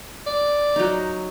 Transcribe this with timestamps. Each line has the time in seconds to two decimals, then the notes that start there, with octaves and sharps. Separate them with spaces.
0.27 D5
0.76 F#3 D#4